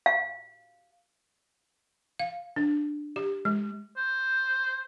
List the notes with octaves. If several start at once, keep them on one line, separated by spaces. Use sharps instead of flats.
F5
F5
D4
G4
G#3
C5